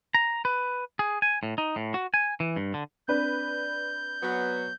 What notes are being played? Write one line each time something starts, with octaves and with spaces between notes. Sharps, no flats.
A#5
B4
G#4
G#5
A2
D#4
A2
F#4
G#5
E3
G2
D3
C4 D4 B4 G6
F#3 B3